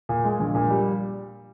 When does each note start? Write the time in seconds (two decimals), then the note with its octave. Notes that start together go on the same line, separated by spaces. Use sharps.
0.09 A#2
0.24 G#3
0.40 A#1
0.55 A#2
0.70 G3